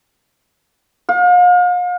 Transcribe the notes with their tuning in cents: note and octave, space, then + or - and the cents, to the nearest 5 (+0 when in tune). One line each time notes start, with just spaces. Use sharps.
F5 +40